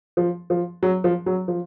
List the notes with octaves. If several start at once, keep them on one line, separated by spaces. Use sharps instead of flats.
F3
F3
F#3
F3
F#3
F3